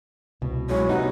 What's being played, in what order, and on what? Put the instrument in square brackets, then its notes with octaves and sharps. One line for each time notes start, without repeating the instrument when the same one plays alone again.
[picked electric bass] C2 [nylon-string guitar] B2
[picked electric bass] F#3 [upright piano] G#3 E4 G#4 [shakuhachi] C#5
[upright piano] C3 G3 B3 [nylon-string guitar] D#4 [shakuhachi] F#5